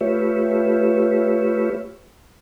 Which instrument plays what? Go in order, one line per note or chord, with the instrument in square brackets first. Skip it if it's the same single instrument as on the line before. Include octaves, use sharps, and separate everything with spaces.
[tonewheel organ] A3 F4 G4 B4 C#5 E5